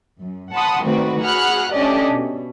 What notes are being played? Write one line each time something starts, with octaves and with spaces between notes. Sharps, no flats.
F#2
F#5 A5 B5 C6 D#6
D#3 A3 C4 F#4 B4 D5
F#4 G#4 F#5 B5 F6 F#6
A3 C#4 D4 G4 D5 D#5
B2